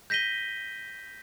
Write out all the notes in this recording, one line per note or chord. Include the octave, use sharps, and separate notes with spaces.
G6 A#6 B6 D#7 G7